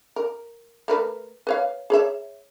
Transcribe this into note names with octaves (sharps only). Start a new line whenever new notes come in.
A#4
A3 A#4 B4
B4 C#5 F5
G#4 C#5 E5